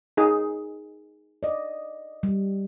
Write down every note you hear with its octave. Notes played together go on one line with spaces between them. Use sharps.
D#4 G#4
D5 D#5
G3